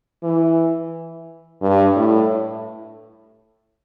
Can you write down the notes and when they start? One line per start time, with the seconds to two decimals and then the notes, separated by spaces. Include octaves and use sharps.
0.23 E3
1.62 G2
1.96 A2